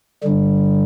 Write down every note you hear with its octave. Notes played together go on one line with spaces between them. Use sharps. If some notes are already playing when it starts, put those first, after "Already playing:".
G2 D3 G3